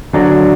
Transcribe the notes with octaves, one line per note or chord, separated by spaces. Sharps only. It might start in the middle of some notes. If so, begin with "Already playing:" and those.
D3 F#3 D4